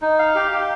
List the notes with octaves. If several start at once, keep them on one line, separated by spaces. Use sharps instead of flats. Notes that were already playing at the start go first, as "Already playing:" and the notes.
D#4
F5
G4
G4